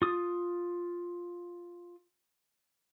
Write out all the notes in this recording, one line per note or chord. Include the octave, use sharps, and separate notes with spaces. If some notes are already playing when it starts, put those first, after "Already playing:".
F4 D#6